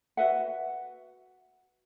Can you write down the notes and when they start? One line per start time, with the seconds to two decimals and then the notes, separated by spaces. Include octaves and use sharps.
0.17 F#4 B4 E5 F#5